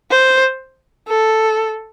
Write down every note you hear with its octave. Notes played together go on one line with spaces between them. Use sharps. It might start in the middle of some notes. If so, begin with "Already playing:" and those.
C5
A4